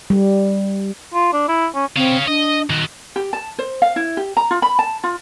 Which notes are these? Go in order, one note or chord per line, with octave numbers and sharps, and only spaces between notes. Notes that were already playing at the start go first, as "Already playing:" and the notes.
G3
F4
D4
E4
C#4
C4 C#5 F5
D4 D#5
D#3 F#4
G4
A5
C5
F5
E4
G4
A#5
F4
B5
A5
F4